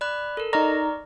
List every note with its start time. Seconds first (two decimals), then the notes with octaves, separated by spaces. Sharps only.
0.01 D5 B5 F#6
0.37 A4 A#4
0.53 D#4 D5 A#5 C#6 F6